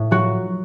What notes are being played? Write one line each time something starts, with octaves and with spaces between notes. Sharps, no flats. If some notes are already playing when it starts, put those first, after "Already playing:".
Already playing: A2
F#3 F#4